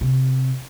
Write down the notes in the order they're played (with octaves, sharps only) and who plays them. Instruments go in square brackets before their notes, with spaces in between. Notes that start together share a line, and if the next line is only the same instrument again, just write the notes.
[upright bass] C3